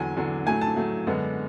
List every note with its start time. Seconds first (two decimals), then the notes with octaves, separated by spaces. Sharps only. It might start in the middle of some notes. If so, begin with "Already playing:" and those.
Already playing: E2 D3 F#3 G#5
0.16 E2 D3 F#3
0.46 A2 F#3 A3 G#5
0.61 A5
0.76 A2 F#3 A3
1.07 F#2 D3 G#3 B3